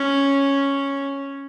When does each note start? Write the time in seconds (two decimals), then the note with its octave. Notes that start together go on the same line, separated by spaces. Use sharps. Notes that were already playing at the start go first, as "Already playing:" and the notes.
Already playing: C#4